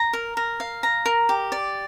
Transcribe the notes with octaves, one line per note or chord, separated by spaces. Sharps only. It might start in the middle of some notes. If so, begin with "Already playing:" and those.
Already playing: A#5
A#4
A#4
F5
A#5
A#4
G4
D5